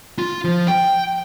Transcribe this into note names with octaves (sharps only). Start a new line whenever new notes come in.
F4
F3
G5